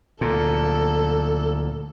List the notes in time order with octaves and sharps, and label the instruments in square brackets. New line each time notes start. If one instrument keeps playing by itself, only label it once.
[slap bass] D2 A#2 [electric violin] A4